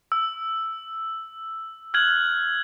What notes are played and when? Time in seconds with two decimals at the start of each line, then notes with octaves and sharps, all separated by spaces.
0.12 E6
1.94 F6 F#6 G#6 F#7